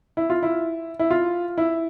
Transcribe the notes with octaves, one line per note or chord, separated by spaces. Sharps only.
E4
F4
E4
E4
F4
E4